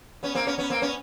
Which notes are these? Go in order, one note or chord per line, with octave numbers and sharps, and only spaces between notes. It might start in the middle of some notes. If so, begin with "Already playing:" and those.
B3 C#4
A#3 C4
B3 C#4
B3 C#4
A#3 C4
B3 C#4